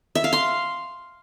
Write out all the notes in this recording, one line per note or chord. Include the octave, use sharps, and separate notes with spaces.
E5
F5
C6